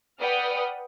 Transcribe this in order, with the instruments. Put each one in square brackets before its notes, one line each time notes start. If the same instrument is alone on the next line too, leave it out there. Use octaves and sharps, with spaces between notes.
[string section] B4 D5 F#5 G5 D#6 F6